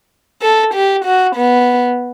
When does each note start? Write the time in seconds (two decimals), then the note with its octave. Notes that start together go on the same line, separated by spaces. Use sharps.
0.42 A4
0.74 G4
1.05 F#4
1.36 B3